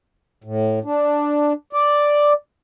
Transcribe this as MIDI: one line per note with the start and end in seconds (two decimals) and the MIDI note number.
0.44 0.79 45
0.85 1.53 62
1.73 2.33 74